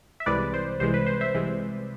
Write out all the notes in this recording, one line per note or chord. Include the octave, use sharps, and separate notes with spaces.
E5
C2 C3 E3 G#3 B4 D5
C5
C2 C3 E3 G#3 C5
B4
C5
C5 E5
C2 C3 E3 G#3